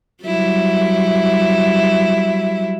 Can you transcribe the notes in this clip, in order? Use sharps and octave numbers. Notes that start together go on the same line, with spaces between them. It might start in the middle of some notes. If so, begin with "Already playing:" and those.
F#3 G3 E4